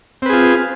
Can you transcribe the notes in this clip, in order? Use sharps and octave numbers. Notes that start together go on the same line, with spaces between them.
C4 F4 G#4 B4